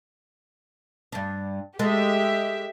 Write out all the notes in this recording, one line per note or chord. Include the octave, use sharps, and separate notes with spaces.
G2 D4
G#3 G4 A4 E5